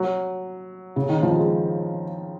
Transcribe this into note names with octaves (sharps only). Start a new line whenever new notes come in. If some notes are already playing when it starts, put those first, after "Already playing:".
Already playing: F#3
C#3
D#3
F3
G#3